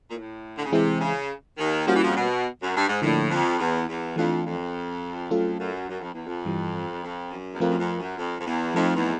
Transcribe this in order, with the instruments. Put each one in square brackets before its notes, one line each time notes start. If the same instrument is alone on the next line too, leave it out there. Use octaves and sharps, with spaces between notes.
[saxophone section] A#2
A2
D3
C#3
[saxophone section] C3 [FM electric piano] E3 G#3 C4 E4 G#4
[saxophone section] C#3
D#2 D#3
[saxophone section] F3 [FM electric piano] G3 A#3 C#4 F#4
[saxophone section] E3
F2 F3
C3
B2
F#2
G2
G#2
[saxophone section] A2 [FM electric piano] D3 F3 A#3 D4
[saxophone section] F2
E2
E2
[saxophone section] F2 [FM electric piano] E3 A3 D4 F4
[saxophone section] F2
[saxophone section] F2 [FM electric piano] F#3 A3 C#4 F4 A4
[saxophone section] F#2
F#2
F2
E2
F2
[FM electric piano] G2 E3 G3
[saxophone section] F2
F#2
E2
[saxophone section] F2 [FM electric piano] F3 A3 C4 F4 A#4
[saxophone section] F#2
F2
F#2
F2
F2
E2
[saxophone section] F2 [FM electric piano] F3 A3 C4 D#4
[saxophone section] E2